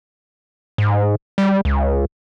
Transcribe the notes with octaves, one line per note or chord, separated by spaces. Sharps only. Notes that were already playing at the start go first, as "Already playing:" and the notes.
G#2
G3
C#2